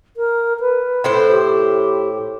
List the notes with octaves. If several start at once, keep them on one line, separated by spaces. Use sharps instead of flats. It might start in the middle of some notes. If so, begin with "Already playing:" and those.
A#4
B4
A2 E4 C5
G4